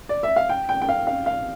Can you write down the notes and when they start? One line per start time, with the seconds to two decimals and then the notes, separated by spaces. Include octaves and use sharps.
0.09 D5
0.23 E5
0.36 F5
0.49 G5
0.69 G5
0.82 G5
0.89 F5
1.07 F5
1.26 F5